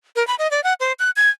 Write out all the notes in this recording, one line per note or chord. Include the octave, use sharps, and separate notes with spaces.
A#4
B5
D#5
D5
F#5
C5
F#6
G#6